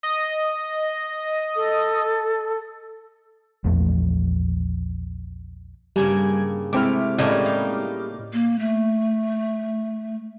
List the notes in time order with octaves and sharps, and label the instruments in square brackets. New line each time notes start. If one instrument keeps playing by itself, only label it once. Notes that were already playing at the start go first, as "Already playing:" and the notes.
[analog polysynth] D#5
[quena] A4
[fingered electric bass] A#1 E2 F3 A3
[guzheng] G2 C#3 A#3 [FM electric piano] G3 G#5 G#6
[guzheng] C3 A3 [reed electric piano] G#3 C4 E4 [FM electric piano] D6 F6
[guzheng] A2 A#3 G#5 [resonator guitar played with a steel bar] C#3 G3 D#5
[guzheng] D#4 F5
[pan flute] A#3
A3